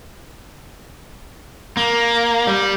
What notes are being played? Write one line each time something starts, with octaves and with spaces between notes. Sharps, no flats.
A#3
G3